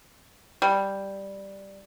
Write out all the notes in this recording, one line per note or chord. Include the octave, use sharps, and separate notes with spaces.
G3